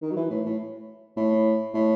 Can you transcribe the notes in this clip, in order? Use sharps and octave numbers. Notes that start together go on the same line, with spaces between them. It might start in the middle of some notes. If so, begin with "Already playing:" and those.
D#3
F#3
E3
A2
A2
A2
A2